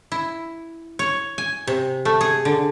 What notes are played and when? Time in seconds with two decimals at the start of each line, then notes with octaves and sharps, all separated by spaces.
0.12 E4
0.99 C#5
1.38 G#5
1.67 C3
2.05 A3
2.21 G#4
2.45 D3